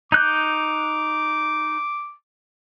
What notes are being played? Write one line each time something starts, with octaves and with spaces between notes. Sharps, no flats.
D#4 D6 F#6 G6